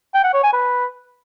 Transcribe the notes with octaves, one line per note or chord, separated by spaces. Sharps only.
G5
F#5
C#5
G#5
B4